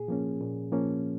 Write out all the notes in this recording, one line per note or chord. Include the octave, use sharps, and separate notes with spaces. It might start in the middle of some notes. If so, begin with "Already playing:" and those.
Already playing: A#2 G#4
F3 A#3 C#4
A#2
F3 A#3 C#4